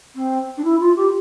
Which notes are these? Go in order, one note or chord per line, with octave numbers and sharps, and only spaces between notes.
C4
D4
E4
F4
G4